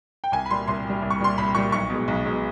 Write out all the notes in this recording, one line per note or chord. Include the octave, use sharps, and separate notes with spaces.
G5
C2 G#5
B5
A#2 G3 C6
C2 C6
A#2 G3
C2
C#6
A#2 G3 C6
C2 B5
A#2 G3 C#6
B1 C#6
B2 G#3
B1
B2 G#3